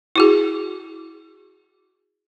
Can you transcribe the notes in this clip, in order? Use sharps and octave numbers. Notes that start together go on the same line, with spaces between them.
E4 F#4 G#4